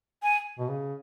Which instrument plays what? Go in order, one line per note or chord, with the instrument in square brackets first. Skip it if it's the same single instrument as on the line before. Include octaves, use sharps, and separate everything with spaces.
[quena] G#5
[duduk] B2
C#3